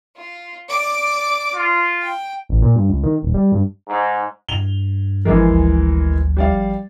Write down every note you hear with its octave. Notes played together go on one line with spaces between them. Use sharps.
F4
D5 D6
F4
G5
A1
A#2
G2
C#2
D#3
D#1
G3
G2
G#2
G2 F7 G7
G#1 E3 F3 G#3 A#4
D2
G3 D5 F5